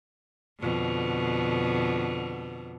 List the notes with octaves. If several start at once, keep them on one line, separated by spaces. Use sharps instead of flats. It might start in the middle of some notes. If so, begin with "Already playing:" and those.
F2 B2 D3